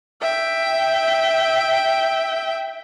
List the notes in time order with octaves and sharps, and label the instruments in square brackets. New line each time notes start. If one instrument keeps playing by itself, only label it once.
[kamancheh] E5 G5